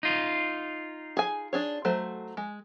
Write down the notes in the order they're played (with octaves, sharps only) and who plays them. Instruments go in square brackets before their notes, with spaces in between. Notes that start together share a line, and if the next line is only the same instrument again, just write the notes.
[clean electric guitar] D#4 F4
[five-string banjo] G#4 G#5
D4 G#4 C#5
F#3 A3 C5
G#3